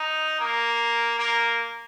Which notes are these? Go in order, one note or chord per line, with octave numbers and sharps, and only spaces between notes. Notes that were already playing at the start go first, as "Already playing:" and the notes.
Already playing: D#4
A#3
A#3